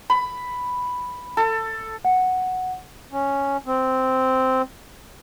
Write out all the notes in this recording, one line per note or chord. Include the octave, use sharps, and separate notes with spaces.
B5
A4
F#5
C#4
C4